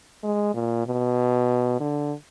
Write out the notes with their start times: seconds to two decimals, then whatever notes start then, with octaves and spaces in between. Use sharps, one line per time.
0.24 G#3
0.54 A#2
0.86 B2
1.80 D3